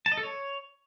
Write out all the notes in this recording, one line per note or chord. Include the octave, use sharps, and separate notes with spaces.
A5
D#5
A4
C#5